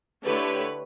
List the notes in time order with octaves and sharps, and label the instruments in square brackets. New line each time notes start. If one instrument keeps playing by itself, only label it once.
[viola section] D3 A3 E4 G4 C#5 [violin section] B4